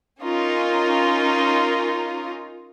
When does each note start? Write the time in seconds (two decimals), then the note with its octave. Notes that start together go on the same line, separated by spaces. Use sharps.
0.22 C#4 D#4 F4 A#4